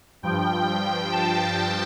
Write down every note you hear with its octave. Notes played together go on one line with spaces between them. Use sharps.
G2 F3 G5
A5